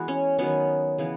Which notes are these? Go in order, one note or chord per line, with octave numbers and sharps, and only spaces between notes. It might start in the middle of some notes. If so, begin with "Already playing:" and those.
Already playing: E3 G#3 B3 F#4
C#4
D#3 F#3 B3 C#4
C#3 E3 B3